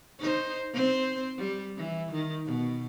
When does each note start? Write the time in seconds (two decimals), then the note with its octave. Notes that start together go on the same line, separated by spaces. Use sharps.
0.19 D#4 C5
0.73 C4 C5
1.38 G3
1.77 E3
2.12 D#3
2.45 B2